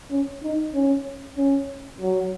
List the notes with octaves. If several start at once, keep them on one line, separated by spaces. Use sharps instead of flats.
C#4
D#4
C#4
C#4
F#3